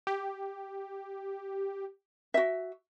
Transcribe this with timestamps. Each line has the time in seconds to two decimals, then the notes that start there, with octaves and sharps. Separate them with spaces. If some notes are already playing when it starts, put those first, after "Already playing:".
0.07 G4
2.34 F#4 E5